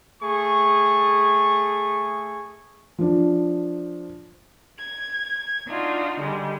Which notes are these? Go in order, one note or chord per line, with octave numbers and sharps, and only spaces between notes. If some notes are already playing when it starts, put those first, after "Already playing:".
A3 G#4 C#6
F3 D4
G#6
D4 D#4 F4 F#4
D3 G3 G#3